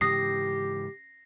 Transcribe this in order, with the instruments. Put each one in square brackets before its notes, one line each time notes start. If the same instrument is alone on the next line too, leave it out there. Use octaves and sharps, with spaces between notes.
[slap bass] G#2 C#3 E3 [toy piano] C#4 D#6 [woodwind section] G4 [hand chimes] A#6 C7